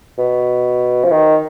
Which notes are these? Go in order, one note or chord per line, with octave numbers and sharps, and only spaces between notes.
B2
F3
D#3